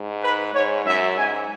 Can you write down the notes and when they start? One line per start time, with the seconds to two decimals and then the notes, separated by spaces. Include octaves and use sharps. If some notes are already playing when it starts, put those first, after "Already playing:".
Already playing: G#2
0.24 B4
0.55 G#2 C#5
0.86 F#2 E5
1.18 G#2 G#5